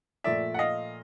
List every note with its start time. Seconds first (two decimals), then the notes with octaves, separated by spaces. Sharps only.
0.24 A#2 F3 A3 D5 E5
0.54 F#5
0.59 D#5 F5